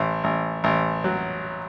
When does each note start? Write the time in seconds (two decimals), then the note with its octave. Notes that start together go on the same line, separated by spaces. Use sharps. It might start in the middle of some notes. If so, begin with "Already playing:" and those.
Already playing: A1
0.24 A1
0.64 A1
1.04 F#3